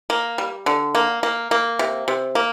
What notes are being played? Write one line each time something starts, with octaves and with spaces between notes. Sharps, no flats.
A#3
G3
D3
A#3
A#3
A#3
C3
C3
A#3